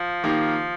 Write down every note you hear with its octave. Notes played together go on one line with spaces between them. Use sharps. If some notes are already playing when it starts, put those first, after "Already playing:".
Already playing: F3
D#3 A#3 D#4 G4